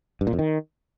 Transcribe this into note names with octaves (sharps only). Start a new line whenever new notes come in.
G2
A#2
F2
D#3